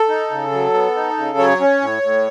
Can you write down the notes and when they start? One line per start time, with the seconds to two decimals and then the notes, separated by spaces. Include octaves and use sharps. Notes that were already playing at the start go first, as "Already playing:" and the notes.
Already playing: A4
0.09 D#4
0.31 C#3
0.52 F#3
0.74 B3
0.96 D#4
1.17 C#3
1.38 F#3 C#5
1.60 C#4
1.81 A2
2.02 A2